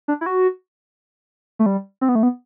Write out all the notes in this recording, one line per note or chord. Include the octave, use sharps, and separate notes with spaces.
D4
E4
F#4
A3
G3
C4
B3
A3
B3